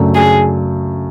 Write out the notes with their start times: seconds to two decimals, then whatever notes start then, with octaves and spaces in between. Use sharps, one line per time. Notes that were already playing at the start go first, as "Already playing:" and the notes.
Already playing: F#2 C#3 F#3 A3 D4
0.15 G#4